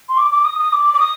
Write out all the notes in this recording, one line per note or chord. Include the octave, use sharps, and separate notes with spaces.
C6
D6
D6
D#6
D#6
D6
D6
D#6